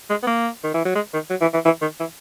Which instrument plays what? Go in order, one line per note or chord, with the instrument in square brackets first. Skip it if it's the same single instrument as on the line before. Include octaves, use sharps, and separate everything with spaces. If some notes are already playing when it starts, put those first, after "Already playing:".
[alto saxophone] G#3
B3
A#3
D#3
E3
F#3
G#3
D#3
F#3
E3
E3
E3
D#3
E3